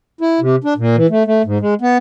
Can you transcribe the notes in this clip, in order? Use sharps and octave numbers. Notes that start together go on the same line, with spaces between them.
E4
C3
D4
A#2
E3
A3
A3
G#2
G#3
B3